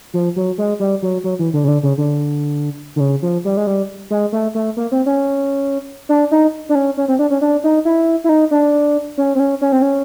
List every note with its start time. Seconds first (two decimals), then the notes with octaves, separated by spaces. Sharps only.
0.14 F3
0.36 F#3
0.58 G#3
0.80 G3
1.02 F#3
1.24 F#3
1.39 E3
1.53 D3
1.64 C#3
1.68 D3
1.83 C#3
1.98 D3
2.96 D3
3.00 C#3
3.22 F3
3.45 G3
3.57 G#3
3.67 G3
4.10 G#3
4.32 A3
4.55 A3
4.77 A#3
4.92 C4
5.06 C#4
6.09 D4
6.31 D#4
6.69 D4
6.75 C#4
6.97 C#4
7.08 C4
7.19 D4
7.30 C#4
7.41 D4
7.64 D#4
7.85 E4
8.24 E4
8.29 D#4
8.51 D4
9.18 C#4
9.35 C4
9.39 C#4
9.61 C#4
9.72 C4
9.82 C#4